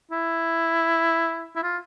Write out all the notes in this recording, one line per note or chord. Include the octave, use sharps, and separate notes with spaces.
E4
E4
F4